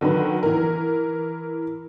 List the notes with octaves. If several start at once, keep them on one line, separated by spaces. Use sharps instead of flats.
D3 D#3 F#3 B4
E3 A#4